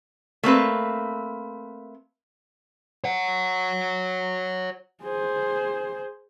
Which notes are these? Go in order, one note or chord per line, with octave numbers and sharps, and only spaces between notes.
A3 A#3 C4 B4
C#5 F#5
G#4 C5